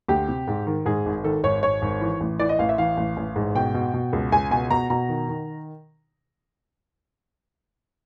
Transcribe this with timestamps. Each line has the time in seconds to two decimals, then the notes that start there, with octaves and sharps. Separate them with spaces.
0.08 D2 G4
0.28 C3
0.48 G#2
0.67 D#3
0.86 G#2 G#4
1.06 G#1
1.24 D#3 A4
1.44 G#1 C#5
1.63 G#1 C#5
1.82 G#1
2.01 E3
2.21 A1
2.40 E3 D5
2.49 D#5
2.59 A1 F5
2.69 E5
2.78 E3 F5
2.97 A1
3.17 A1
3.36 G#2
3.55 B2 G5
3.74 B2
3.94 B2
4.13 C#2
4.32 C#2 G#5
4.51 B2 G#5
4.70 B2 A#5
4.90 B2 A#5
5.09 D#3
5.28 D#3